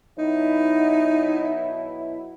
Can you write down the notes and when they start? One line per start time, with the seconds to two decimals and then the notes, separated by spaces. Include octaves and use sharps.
0.19 B2 F#3 D#4 E4